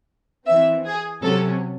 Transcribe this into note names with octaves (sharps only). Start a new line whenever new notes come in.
E3 C4 E5
G#4
C3 F#3 C#4 A4